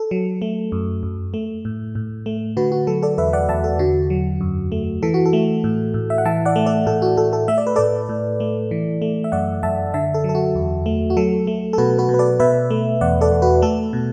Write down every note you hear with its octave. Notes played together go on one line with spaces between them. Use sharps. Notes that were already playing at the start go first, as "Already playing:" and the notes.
Already playing: A4
F#3
A3
F#2
F#2
A3
A2
A2
A3
D3 F#4 B4
F#4
F#3 A4
A4 D5
E2 B4 E5
D5 F#5
E2 E5 A5
A4
D3 F#4
F#3
F#2
A3
E3 A4
F#4
A4
A3
A2
A2
E5
F#5
E3 E5 A5
D5 F#5
A3
A4 D5
A2 A4
F#4
A2 A4
A4
A3 E5
D5
B4
A2 A4 D5
A2
A3
E3
A3
E5
F#2 D5 F#5
F#2 E5 A5
D3 E5 A5
A4
F#3
A4
F#4
E2
A3
F#4
F#3 A4
A3
A4
B2 F#4 B4
F#4 B4
B2
B4
A4 D5
B2 B4 E5
A3
E2 D5 F#5
A4 D5
E2
F#4 B4
A3 A4
B2